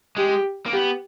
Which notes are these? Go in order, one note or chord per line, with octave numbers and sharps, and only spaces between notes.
G#3 G4
A#3
B3 G4